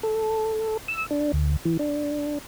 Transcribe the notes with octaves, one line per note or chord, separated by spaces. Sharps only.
A4
E6
D4
D2
E3
D4